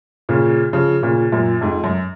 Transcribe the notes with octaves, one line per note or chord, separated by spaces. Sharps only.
A#2 C#3
C#3 F3
A#2 C#3
F#2 A#2
F2 G#2
F#2